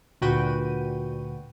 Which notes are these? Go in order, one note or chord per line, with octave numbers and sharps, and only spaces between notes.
D2 A#2 F#4 B4 G5 D#7